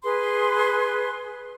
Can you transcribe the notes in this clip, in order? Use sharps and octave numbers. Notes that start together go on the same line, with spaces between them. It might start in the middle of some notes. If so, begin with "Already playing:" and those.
G#4 B4 C6